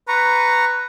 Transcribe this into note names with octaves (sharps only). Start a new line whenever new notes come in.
B4 A#5 C#6